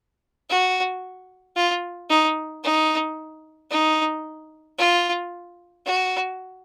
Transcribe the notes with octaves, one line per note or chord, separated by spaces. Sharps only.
F#4
F4
D#4
D#4
D#4
F4
F#4